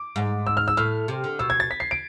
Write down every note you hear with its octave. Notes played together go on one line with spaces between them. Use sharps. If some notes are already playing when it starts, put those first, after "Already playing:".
Already playing: D6
G#2
E6
F6
E6
A2 F6
C3
D3
B2 E6
G#6
A6
B6
C7
D7